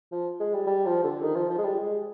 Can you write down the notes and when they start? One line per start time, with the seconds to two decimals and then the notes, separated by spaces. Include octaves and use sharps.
0.12 F3
0.40 G#3
0.53 G3
0.67 G3
0.86 F3
1.04 D3
1.22 D#3
1.36 F3
1.50 F3
1.58 G#3
1.64 G3
1.78 G#3